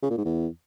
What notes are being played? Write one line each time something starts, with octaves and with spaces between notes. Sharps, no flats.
C#3
A#2
G#2
E2